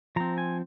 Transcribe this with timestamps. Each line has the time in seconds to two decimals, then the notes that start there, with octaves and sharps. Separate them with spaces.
0.16 F3 C4 A#5
0.38 G#5